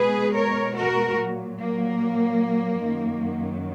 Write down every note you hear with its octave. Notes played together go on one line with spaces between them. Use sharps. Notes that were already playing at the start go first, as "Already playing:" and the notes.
Already playing: B2 G#3 G#4 B4
A#4 C#5
F#4 A#4
A#2
F#3
A#3
F#2 D#3 F#3